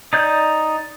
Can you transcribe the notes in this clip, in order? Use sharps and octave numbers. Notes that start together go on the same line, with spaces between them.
D#4 D5 G6